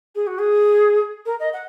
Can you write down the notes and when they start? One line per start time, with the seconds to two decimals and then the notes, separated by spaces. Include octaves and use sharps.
0.15 G#4
0.27 F#4
0.38 G#4
1.26 A#4
1.40 D#5
1.53 F#5